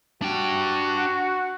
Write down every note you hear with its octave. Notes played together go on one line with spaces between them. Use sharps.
D4 F#4 G5